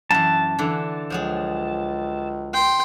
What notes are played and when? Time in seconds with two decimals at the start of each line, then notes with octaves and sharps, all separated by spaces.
0.11 F#2 E3 A5
0.59 D3 E3
1.10 C#2 F3 F#3 G#4
2.54 G5 C6